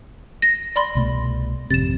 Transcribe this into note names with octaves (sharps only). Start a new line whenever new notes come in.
A#6
D5 B5 C6
C2 B2 A3
G#1 F2 C3 A6 E7